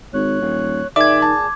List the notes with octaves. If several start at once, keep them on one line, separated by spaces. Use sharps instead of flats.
G#1 C#5 F#6
D#1
A#2 D#3 G#4 D5 E5 D6 G#6
A5